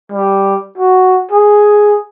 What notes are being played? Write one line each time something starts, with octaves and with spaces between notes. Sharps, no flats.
G3
F#4
G#4